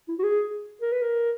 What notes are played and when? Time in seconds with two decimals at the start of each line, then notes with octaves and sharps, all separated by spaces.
0.09 E4
0.19 F#4
0.23 G#4
0.82 A#4
0.92 B4
1.02 A#4